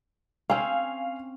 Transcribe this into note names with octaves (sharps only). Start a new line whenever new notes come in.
C4 C#4 F5 G#5